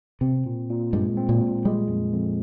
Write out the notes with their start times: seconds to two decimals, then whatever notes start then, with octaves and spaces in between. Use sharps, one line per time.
0.21 C3 C4
0.46 A#2
0.70 A#2
0.93 G2 G#3
1.17 C4
1.29 A#2
1.41 A#2
1.65 G3 G#3
1.89 F2
2.13 F2